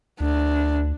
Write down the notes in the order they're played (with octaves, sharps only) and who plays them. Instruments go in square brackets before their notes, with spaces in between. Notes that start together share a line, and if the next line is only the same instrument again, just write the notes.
[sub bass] D2 [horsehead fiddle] D4